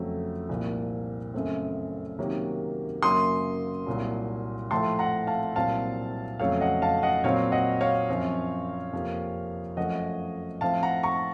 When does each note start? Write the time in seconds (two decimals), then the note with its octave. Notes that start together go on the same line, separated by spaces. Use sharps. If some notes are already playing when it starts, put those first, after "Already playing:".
Already playing: F2 C#3 F#3 A3
0.49 C2 A#2 F3 A#3
1.34 F#2 C#3 A3 C4
2.19 C3 D#3 F#3 A#3 C#4
3.02 F#2 C#3 F#3 A#3 C6 D#6
3.86 C2 A#2 F#3
4.71 A2 F3 A3 A5 C6
4.99 F#5 A#5
5.27 F5 A5
5.56 C2 A#2 F#3 C4 F5 A5
6.39 F2 C#3 F#3 A3 C#5 F5
6.60 D#5 F#5
6.82 F5 A5
7.03 D#5 F#5
7.24 A#2 F#3 C4 C#5 F5
7.52 D#5 F#5
7.81 C#5 F5
8.09 F#2 F3 C4
8.93 F2 C3 F3 A#3
9.77 F#2 F3 A3 D#5 F#5
10.61 A2 F3 C4 F5 A5
10.83 F#5 A#5
11.03 A#5 C#6